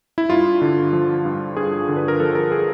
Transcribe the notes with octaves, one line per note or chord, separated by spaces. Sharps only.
E4
G2 F4
D3
F3
G2
G2 G#4
D3
B4
A#4
F3 A4
A#4
G#4